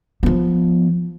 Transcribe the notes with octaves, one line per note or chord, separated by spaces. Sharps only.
F3 B3